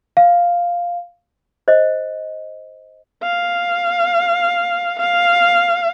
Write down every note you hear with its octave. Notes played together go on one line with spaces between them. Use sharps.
F5
C5 D#5
F5
F5